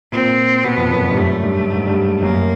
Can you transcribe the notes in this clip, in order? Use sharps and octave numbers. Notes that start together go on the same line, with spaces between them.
A#2 C4
B2 B3
F2
F#2
F2
G2
F#2 A3
F#2
G2
G#2
G2
F#2 A#3